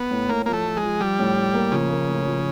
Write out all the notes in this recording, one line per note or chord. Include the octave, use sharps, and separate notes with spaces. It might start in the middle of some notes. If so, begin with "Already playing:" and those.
Already playing: B3
A2
A2 A#3
F3 A#3
A3
F3
G#3
F3
F3 G3
A2
A2
A#3
C#3 F3
A#3
A2
F3